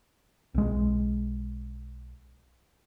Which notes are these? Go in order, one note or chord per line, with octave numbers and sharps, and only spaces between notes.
B1 G#3